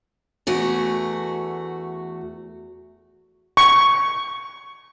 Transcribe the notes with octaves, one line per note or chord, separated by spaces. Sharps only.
E2 A3 F#4
C#6